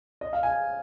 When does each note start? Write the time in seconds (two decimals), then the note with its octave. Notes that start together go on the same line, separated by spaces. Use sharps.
0.21 D#5
0.33 F5
0.43 G#5